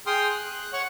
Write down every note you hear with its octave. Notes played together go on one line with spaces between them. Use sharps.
G#4 G5 C6 D#6 F6
F#6
C#5 F#5 C#6